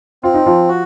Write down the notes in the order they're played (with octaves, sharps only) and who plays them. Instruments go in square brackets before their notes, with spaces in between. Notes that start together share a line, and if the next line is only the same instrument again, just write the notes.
[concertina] C4 [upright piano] F4
[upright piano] D#4
F3 F4
[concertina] F#4